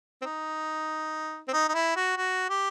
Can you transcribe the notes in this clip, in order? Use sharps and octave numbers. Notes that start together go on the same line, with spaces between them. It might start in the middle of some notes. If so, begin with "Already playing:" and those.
C4
D#4
C4
D#4
D#4
E4
F#4
F#4
G4